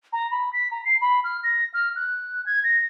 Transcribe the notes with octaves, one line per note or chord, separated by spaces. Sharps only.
A#5
B5
B6
A#5
C7
B5
F6
A#6
F6
F#6
G#6
A#6